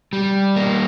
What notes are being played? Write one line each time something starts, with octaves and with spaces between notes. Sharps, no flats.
G3
A#3